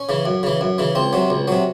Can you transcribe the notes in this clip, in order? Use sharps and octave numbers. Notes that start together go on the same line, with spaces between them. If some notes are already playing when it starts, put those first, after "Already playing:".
Already playing: C#4
C#3 E3
F#2
C#3 E3
F#2
C#3 E3
C#2 C4
C3 F#3
C#2
C3 F#3